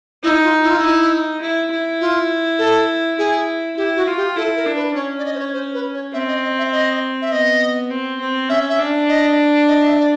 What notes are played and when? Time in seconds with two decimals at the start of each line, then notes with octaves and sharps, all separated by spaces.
0.23 D#4 E4
0.44 F4
0.63 E4
0.70 F4
0.77 D#4 E4
1.41 E4
1.71 E4
2.01 F4
2.59 A4
3.18 E4 G#4
3.77 E4 G4
3.96 F#4
4.07 F4
4.17 G4
4.36 E4 A4
4.56 A#4
4.66 D4
4.76 B4
4.95 C#4 C#5
5.19 D5
5.26 D#5
5.35 C5
5.40 C#5
5.54 C5
5.74 B4
5.94 C#5
6.14 C4 E5
6.28 D#5
6.43 D#5
6.58 E5
6.73 D#5
7.22 E5
7.32 B3 D#5
7.90 C4
8.20 C4
8.49 C#4 E5
8.69 E5
8.79 D4
9.09 D#5
9.68 D#5
9.83 D#5
9.88 E5
10.00 D5